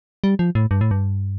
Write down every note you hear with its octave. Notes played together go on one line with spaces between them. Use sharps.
G3
F3
A2
G2
A2
G2